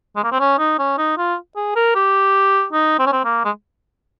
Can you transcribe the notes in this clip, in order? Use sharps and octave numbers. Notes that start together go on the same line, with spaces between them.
G#3
A#3
C4
C#4
D#4
C#4
D#4
F4
G#4
A#4
G4
D#4
C4
C#4
C4
A#3
G#3